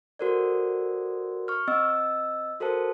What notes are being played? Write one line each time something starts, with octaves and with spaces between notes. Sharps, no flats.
F#4 A4 A#4 C5 D5
C#6 F6
C4 D#5 E6
F#4 A4 A#4 C5 A5